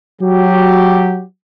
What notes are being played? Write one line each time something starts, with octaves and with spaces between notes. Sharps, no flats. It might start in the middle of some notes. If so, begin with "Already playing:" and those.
F#3 F#4 G4